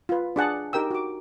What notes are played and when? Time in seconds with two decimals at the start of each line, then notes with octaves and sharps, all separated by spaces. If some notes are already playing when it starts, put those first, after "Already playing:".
0.09 F4 B4
0.36 D4 G#4 F#5 A5
0.73 D#4 G4 A#4 G5 E6
0.91 F#4 D6